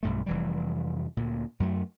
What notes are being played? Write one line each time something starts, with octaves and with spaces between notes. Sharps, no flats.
B1 G2 A3
F1 E3 G3
D2 A#2
F#2 F#3 A3